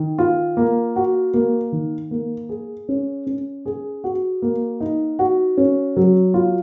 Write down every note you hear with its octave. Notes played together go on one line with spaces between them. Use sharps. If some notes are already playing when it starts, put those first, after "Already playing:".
Already playing: D#3
F4
A#3
F#4
A#3
D#3
A#3
G#4
C#4
C#4
G#4
F#4
A#3
D#4
F#4
C#4
F#3
F4